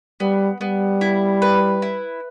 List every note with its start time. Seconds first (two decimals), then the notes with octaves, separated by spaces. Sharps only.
0.20 G3 B3
0.61 G3 B3
1.01 E4
1.42 B4
1.82 E4